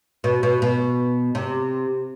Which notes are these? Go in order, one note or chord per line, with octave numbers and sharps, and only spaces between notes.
B2
B2
B2
C3